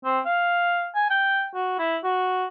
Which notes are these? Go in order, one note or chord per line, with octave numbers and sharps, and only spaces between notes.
C4
F5
G#5
G5
F#4
E4
F#4